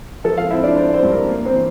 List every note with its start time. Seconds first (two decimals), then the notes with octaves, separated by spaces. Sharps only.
0.24 F3 A4 A5
0.37 F4 F5
0.50 C4 E4 E5
0.63 D4 D5
0.76 C4 C5
0.89 D5
0.94 C4 C5
1.03 G2
1.11 A#4
1.29 A#3
1.45 C4 C5
1.54 E3